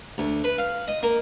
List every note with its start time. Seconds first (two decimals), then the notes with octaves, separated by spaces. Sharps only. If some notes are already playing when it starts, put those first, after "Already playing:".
0.18 D2
0.44 B4
0.58 F5
0.88 D#5
1.03 A#3